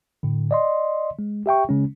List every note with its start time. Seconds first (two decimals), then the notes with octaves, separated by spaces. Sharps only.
0.23 A2 D3
0.51 D5 D#5 C6
1.19 G#3
1.46 G4 E5 G5 C#6
1.69 C#3 G#3 C#4